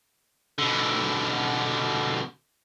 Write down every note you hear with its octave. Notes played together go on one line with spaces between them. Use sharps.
B2 D3